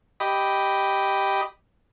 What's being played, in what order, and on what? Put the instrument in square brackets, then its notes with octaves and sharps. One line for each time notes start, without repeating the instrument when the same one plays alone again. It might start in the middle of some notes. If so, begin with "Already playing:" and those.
[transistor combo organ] G4 D#5 B5